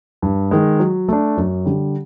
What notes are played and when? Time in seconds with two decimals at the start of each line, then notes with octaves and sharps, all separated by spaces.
0.22 G2
0.51 D#3 G#3
0.80 F#3
1.08 A3 D4
1.37 F#2
1.66 D3 G3